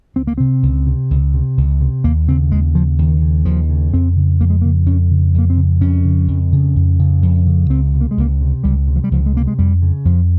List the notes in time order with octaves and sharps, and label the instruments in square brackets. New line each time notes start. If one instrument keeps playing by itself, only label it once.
[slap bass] C#2 C4
A#3
C3 C4
C#2
C3
C#2
C3
C#2
C3
D#2 A#3
C#3 C4
D#2 G#3
C#3 F3
D#2 D#3
C#3
D#2 F3
C#3
F2 C4
C#3
F2 A#3
G#3
C#3 A#3
F2 C#4
C#3
F2 A#3
C4
C#3
F2 C#4
C#3
F2
C#3
F2
C#3
F2
C#3
C#2 C4
C3
A#3
G#3
C#2 A#3
C3
C#2 G3
C3
F3
G3
C#2 F3
G#3
C3 A#3
G#3
F2 G3
C#3
F2 F3